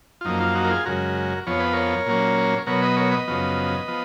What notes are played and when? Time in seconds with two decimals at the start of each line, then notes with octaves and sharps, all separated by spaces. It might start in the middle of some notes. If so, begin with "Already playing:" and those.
0.21 F4
0.25 F#2 F3 A#3 D#4
0.41 F4
0.55 D#4 F#4
0.65 A#4
0.70 F4 G#4
0.85 F#2 C#3 G#3 F#4 A#4
1.47 F2 F3 B3 C#5
1.60 B4
1.73 A#4 C#5
2.06 A#2 F#3 A#3 C#4
2.66 B2 F#3 B3 A#4 C#5
2.82 B4 D#5
2.96 A#4 C#5
3.12 B4 D#5
3.28 F#2 C#3 F3 B3
3.88 F3 B3